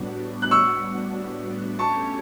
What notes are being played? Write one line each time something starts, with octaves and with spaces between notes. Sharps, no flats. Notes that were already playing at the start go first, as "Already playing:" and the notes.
Already playing: A2 G3 B3 D4 F#4
F#6
C#6 E6
A3 C#4 G4 C#5 A5 C#6